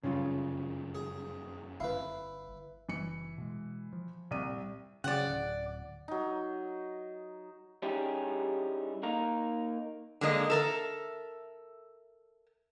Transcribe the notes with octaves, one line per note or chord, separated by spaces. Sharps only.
F1 F#2 C#3 G3 C#4 F4
G#4
G1 E4 B4 F5
F#1 E3 C#7
B2 G#3
F3
C2 A#2 C4 D#7
C#3 F3 F#3 D5 F#5
D1
F#3 D#4
G3 C#4 D#4 E4 G4 G#4
A#3 D#4 A#4
D3 G#3 A#3 D#5
A4 A#4 E5